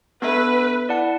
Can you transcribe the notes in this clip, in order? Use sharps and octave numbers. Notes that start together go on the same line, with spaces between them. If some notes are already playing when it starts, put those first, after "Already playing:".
B3 D4 A4 B4 E5
E4 D5 F#5 A5